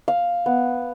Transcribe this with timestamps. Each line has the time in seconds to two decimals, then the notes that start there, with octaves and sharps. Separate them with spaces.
0.08 F5
0.46 B3